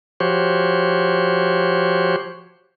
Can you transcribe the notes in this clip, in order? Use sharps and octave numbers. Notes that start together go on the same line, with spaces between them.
F3 F#4 G4 C5 C#5